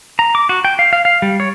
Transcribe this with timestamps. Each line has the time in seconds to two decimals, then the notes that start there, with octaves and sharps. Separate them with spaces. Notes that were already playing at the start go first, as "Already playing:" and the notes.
0.19 A#5
0.35 D6
0.49 F#4
0.65 G5
0.79 F5
0.93 F5
1.05 F5
1.22 G3
1.40 C#5